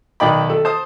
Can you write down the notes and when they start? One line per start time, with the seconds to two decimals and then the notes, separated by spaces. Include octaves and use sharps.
0.20 B1 D#3 D#4 D5 G5 B5
0.50 A4
0.65 C5 A5 D#6